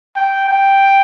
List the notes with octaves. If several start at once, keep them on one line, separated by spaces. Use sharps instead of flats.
G5
G5